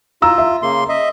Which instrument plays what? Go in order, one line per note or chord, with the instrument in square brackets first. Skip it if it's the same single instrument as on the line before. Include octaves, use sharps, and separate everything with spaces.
[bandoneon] F4 [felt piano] A#5 E6
[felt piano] E5
[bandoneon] C#3 A#3 C6
D#5 E5